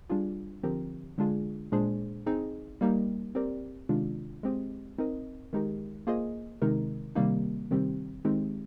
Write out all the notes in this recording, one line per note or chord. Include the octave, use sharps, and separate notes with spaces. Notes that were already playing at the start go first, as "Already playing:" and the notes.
G3 D4 F4 G#4
D3 F3 C4 G4 A#4
D3 G#3 D4 F4 G#4
A#2 G#3 D4 G#4 C5
C4 D#4 G#4
G3 A#3 D#4 G4 A#4
C4 G4 A#4 D5
C3 D#3 G#3 D4 F4
G#3 C4 G4 C5 D#5
C4 D#4 A#4 D#5
D#3 G#3 D#4 G4 A#4
A#3 F4 G#4 C5 D#5
C3 D#3 G#3 D#4 A#4
C3 D#3 G3 A#3 D#4
C3 D#3 G3 C4 G4
D#3 G#3 C4 D#4 G4